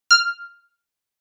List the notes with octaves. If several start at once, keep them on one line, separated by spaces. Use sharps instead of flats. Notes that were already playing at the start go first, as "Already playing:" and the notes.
F6